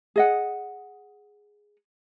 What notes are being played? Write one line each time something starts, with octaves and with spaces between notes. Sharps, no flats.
G#4 D#5 F#5